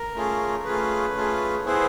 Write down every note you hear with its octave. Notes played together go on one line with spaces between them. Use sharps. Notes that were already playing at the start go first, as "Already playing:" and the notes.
Already playing: A#4
A3 C#4 F4 G#4
A3 C#4 F4 G#4 B4
A3 C#4 F4 G#4
B3 E4 G#4 C5